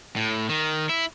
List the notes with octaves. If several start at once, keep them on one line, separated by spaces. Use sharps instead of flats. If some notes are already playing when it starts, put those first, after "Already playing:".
A2
D#3
E4